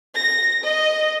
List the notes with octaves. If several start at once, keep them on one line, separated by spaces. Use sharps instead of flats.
A#6
D#5